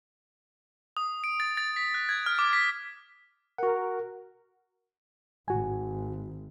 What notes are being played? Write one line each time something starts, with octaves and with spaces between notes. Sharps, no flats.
D#6
D7
A6
A6
B6
F#6
G#6
F6
D6
B6
F#4 A#4 F#5
G#1 F#4 G#5